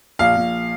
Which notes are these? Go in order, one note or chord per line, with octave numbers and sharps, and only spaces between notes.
A#1 F5
A#1